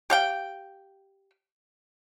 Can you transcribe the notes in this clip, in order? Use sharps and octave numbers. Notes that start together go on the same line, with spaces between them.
G4 F5 G5